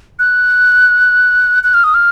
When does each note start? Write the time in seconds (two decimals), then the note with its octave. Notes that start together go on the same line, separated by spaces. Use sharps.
0.19 F#6
1.64 F#6
1.74 F6
1.84 D#6
1.94 F6